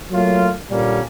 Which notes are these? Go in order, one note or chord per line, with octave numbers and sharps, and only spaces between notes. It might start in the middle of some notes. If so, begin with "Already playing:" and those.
F#3 A3 A#3 F4
A#2 D3 G3 A#3 C#4